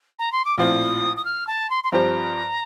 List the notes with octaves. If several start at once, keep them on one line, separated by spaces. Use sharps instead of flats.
A#5
C6
D6
A#1 A2 F3 C4 F4 D#6
D#6
F6
A5
C6
C6
G2 F3 C4 G4 C5 A#5